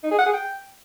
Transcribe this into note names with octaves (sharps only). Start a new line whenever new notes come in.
D#4
G#4
F#5
G#4
G5